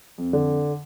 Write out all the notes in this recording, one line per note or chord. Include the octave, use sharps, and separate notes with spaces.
F2
D3